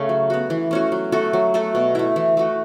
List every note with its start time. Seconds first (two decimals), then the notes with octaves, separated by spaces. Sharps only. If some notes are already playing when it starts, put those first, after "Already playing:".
Already playing: C#3 A3 C#4
0.09 F#3
0.30 B3 F#4
0.50 E3
0.71 A3 C#4 F#4
0.92 F#3
1.12 A3 F#4 A4
1.33 F#3
1.54 A3 F#4 A4
1.75 B2
1.95 A3 E4
2.16 E3
2.37 A3 F#4